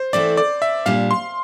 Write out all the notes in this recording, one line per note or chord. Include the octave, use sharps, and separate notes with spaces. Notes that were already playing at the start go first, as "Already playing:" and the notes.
Already playing: C5
E3 A3 C4 E4 D5
D5
E5
A#2 G3 D4 F5
C6